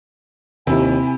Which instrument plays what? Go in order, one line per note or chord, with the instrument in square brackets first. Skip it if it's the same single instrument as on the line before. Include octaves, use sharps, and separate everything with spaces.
[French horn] D#2 [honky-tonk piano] C3 E4 [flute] G#5